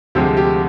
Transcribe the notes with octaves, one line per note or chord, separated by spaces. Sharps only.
D2 C3 F3 G#3 G4
G4